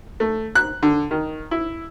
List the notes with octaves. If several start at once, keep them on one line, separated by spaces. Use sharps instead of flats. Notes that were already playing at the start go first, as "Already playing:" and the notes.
A3
F#6
D3
D#3
E4